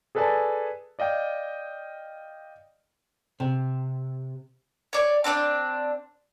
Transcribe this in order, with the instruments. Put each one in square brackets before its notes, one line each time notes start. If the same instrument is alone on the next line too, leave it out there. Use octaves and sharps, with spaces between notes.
[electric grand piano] G#4 A4 B4 D5 G#5 A5
D5 D#5 F5 G5
[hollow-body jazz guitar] C3
[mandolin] C#5 D5
C4 D4 C#5 D5